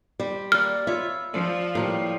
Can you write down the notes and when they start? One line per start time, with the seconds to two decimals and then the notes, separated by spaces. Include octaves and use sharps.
0.20 G3 C5
0.52 A#3 D5 F6
0.87 F4 B4 C#5 E5
1.34 F3 D5
1.75 A2 G3 A#3 F5